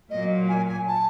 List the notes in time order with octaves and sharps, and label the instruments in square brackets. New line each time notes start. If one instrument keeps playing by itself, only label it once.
[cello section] A#2 F#3 A#3 [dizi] D#5
[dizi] G#5
G#5
A5